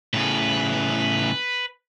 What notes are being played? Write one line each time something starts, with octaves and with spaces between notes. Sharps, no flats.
A2 C#3 B4